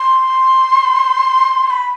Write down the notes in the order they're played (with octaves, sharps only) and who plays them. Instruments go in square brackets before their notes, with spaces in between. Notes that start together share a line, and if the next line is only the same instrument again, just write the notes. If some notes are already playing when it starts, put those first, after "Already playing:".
Already playing: [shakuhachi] C6
C6
B5